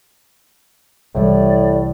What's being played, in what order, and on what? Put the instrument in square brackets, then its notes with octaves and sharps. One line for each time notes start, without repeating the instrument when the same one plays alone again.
[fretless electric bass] C2 E3 G3 [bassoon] A2 [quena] D5